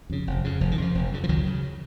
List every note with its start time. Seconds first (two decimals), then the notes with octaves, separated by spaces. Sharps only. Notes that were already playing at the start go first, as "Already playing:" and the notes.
0.10 F2 C#3
0.27 F1
0.44 F2 C#3
0.61 F1 F3
0.71 D#3
0.78 F2 C#3 F3
0.95 F1
1.12 F2 C#3
1.24 F3
1.29 C#2 D#3 F#3
1.46 C#3